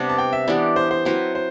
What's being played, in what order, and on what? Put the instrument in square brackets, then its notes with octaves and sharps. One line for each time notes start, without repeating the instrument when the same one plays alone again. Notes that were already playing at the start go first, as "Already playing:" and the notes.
Already playing: [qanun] C3 G3 B3 D4
[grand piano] A5
G5
E5
[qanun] E3 B3 D4 G4 [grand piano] D5
[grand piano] C5
C5
[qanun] F#3 C4 E4 B4 [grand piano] C5
[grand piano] C5